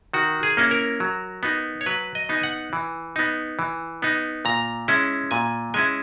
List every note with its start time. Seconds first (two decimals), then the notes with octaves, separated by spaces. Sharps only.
0.14 D#3 F#4
0.43 G#4
0.57 A#3 C#4 E4
0.71 A#4
1.00 F#3
1.43 B3 D#4
1.81 C#5
1.86 F#3 B4
2.15 D#5
2.29 B3 D#4
2.35 G#5
2.43 F#5
2.73 E3
3.16 B3 D#4
3.59 E3
4.02 B3 D#4
4.45 A#2 A#5
4.88 G#3 C#4 E4
5.31 A#2 G#5
5.74 G#3 C#4 E4 G#5